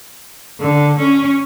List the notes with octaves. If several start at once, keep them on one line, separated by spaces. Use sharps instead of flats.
D3
C#4